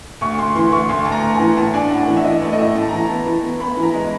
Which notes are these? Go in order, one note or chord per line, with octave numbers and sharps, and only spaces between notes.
D2 C#6
D2 C6
E3 C6
D2 C#6
D2 C6
D2 A5
A#5
D2
G#5
E3
A2 A5
D4 G#5
A2 F#5
E3
E5
E3 D#5
A3
D#5
A2 E5
A2 A5
E3 A#5
A5
B3
E3
B3
B3 B5
E3
A#5
G#3